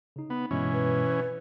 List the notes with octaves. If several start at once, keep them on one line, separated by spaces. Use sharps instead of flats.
C#3 D#4
B3
G2 B2 E3 G#3 C#4
B4